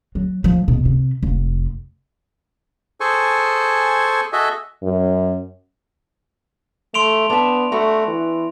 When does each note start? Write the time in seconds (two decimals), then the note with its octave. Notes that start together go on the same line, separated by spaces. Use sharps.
0.15 F#3
0.44 F3
0.68 B2
0.85 C3
1.23 F1
3.00 G#4 A4 C5 G#5 C#6
4.33 F#4 G#4 A4 D#5 E5
4.83 F#2
6.94 A3 C6 D7 F7
7.30 B3 D4 E5
7.72 A3 B3 F#4
8.07 E3